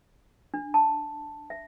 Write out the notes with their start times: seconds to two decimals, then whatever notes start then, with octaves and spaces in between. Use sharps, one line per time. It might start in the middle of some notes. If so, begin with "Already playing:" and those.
0.54 D4
0.74 A5
1.50 E5